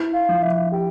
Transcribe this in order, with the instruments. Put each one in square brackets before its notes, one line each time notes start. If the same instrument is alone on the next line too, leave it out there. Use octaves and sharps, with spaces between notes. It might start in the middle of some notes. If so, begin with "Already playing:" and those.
Already playing: [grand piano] E4
[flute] F5
[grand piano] F3
[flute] E5
[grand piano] G4 [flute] G5